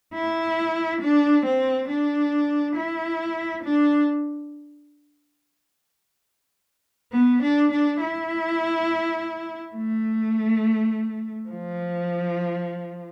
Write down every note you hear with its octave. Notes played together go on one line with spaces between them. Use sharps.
E4
D4
C4
D4
E4
D4
B3
D4
D4
E4
A3
F3